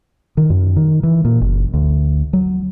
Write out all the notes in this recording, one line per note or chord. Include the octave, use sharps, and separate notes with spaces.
D#3
F#2
D#3
E3
A#2
F#1
D2
F#3